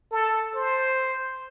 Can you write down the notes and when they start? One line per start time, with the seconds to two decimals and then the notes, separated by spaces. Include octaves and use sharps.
0.12 A4
0.56 C5